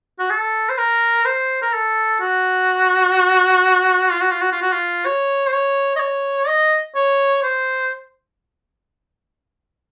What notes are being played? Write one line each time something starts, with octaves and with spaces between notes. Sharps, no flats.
F#4
A4
C5
A#4
C5
A#4
A4
F#4
F4
F#4
F4
F#4
F4
F#4
F4
C#5
C5
C#5
D#5
C#5
D#5
C#5
C5